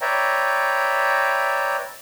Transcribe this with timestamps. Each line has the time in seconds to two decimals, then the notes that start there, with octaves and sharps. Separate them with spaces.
0.01 B4 C#5 D5 E5 G5 A#5